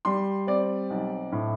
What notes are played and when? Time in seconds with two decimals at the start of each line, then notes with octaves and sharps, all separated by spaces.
0.05 G3 C6
0.47 C4 D5
0.90 B1
1.32 A2